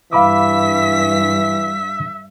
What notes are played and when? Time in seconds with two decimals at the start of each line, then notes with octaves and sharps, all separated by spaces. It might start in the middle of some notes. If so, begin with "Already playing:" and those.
0.13 G2 E3 E5 F5 B5 D6 B6